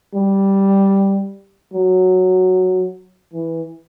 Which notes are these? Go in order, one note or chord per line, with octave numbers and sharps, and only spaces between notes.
G3
F#3
E3